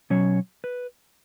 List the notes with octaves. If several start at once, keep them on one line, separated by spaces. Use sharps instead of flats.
B2 F#3 C#4 C#5
B4